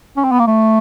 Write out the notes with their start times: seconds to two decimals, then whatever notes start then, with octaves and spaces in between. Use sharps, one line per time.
0.17 C#4
0.24 C4
0.32 B3
0.39 A#3
0.47 A3